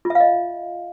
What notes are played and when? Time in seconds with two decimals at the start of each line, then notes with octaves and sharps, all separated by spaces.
0.05 F4
0.10 E5
0.15 F5
0.20 D#5